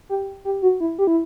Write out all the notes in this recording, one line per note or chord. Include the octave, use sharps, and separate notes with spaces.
G4
G4
F#4
E4
G4
E4